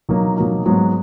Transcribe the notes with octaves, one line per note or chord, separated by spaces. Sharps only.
B2 F#3 A#3 D#4
B2 F#3 A#3 D#4
G#2 F#3 B3